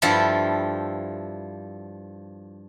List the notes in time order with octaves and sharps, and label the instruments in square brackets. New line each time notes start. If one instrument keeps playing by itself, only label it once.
[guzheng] G2 F3 G3 E4 F4 A4